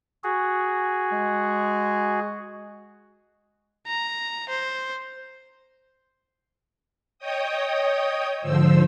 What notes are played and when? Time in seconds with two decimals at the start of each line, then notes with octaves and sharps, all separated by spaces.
0.23 F#4 G#4
1.12 G#3
3.87 A#5
4.50 C5
7.19 C#5 D#5 G5 D#6
8.41 G#2 D3 F3 C5 E6